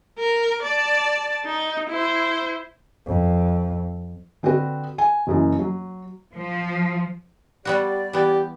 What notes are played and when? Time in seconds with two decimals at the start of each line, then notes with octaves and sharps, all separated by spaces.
0.19 A#4
0.62 D5 A5
1.45 D#4
1.89 E4 C5
3.07 F2
4.43 D3 C4 D4 F#4 B4
4.98 G#5
5.27 F#1 F#2 E3
5.59 F#3
6.34 F3
7.65 G3 B3 F#4 G4 D5
8.13 E3 B3 G4